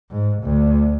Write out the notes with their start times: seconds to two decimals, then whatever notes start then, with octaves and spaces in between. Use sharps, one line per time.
0.11 G#2
0.43 D2